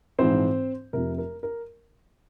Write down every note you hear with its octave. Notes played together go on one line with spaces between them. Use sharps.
A#1 G#2 E3 C4 C5
F1 F2 C3 A#4
A#4
A#4